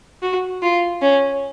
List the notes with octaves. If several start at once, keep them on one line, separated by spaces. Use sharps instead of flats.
F#4
F4
C#4